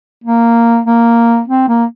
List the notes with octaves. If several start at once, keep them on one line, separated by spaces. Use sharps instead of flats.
A#3
A#3
C4
A#3